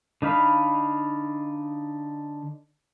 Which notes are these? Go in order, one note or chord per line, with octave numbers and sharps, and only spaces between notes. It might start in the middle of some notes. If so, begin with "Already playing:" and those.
D3 D#4 F5 B5